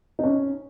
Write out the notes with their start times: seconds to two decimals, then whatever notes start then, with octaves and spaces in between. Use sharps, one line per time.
0.19 D#4
0.23 C#4